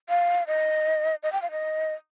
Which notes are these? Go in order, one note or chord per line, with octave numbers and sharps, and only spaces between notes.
F5
D#5
D#5
G5
F5
D#5